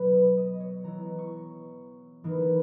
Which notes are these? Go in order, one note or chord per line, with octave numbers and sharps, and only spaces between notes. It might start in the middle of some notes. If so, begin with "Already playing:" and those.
Already playing: B2 F#3 B4
D#5
D#5
D#5
C#5
E3 B3 E4 A#5
C#6
E3 A#3 D#4